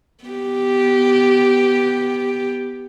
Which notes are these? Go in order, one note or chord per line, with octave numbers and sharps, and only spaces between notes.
B3 G4